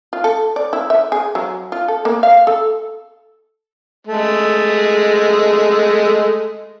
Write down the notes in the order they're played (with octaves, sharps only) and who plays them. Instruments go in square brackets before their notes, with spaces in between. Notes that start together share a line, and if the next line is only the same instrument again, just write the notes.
[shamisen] F4
A4
D5
E4
E5
G#4
F#3
F4
A4
A#3
F5
A4
[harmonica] G#3 A3